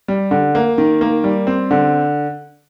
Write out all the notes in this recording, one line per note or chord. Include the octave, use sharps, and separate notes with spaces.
G3
D3
A#3
D#3
A#3
G3
C4
D3